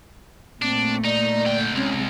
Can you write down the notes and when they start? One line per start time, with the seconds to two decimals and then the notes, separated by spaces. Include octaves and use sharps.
0.62 A#2 A3 C4 D4
1.04 D#4 D5
1.46 D3 G5
1.75 C2 G#3 C4 C#4